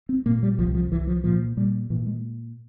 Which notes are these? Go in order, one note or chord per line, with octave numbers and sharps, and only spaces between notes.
C4
A#2 A#3
G3
C2 F3
F3
C2 E3
F3
A#2 F3
A#2 G3
A#2 E3
G#3